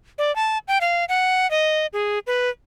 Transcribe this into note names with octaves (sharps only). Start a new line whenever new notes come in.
D5
A5
G5
F5
F#5
D#5
G#4
B4